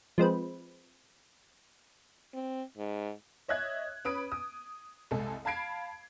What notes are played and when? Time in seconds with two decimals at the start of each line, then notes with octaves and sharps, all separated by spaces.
0.18 F3 G#3 C4 B4
2.34 C4
2.77 G#2
3.48 C#5 D#5 E5 F#6 G#6
4.05 C#4 B4 B5 D#6 D7
4.32 D#6
5.11 C2 G#3 A4 G#5
5.45 F5 A5 B5 G#6 C7 D7